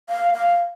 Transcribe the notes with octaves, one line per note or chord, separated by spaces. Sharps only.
F5
F5